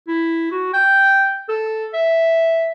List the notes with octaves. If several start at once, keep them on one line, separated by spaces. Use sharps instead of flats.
E4
F#4
G5
A4
E5